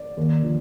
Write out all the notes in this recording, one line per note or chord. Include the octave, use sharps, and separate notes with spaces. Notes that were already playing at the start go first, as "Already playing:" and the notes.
Already playing: D5
D#2
D3 F3